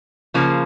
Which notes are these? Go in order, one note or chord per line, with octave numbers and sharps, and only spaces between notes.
C#3 F3 A#3